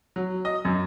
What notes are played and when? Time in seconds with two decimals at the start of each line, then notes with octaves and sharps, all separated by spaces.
0.16 F#3
0.45 D#5
0.65 F#2